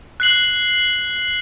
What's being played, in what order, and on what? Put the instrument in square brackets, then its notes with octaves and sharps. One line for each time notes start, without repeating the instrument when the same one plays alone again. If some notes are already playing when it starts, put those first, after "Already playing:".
[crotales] F#6 C7 F#7